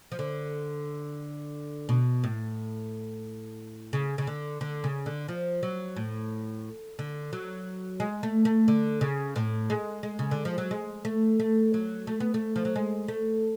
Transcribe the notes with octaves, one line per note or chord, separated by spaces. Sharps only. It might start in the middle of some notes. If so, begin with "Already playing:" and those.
F3
D3
B2
A2
C#3
C#3
D3
D3
C#3
D3
F3
F#3
A2
D3
F#3
G#3
A3
A3
D3
C#3
A2
G#3
G#3
C#3
D3
F3
F#3
G#3
A3
A3
F#3
A3
B3
A3
F3
F#3
G#3
A3